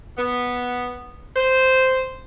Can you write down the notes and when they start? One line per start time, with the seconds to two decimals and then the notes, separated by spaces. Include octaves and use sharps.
0.17 B3
1.35 C5